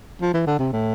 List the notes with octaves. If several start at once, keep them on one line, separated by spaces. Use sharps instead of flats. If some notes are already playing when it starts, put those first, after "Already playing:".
F3
E3
D3
C3
A2